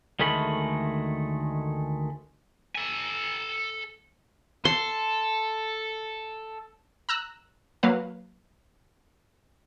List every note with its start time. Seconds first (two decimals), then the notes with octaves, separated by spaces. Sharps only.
0.20 D2 D#3 G#3 A3 B5
2.75 A4 G#5
4.65 A4 C6
7.09 A#5 E6 F#6
7.83 F#3 A#3 B4 F5